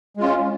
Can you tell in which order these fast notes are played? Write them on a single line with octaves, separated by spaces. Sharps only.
G#3 F4 C#4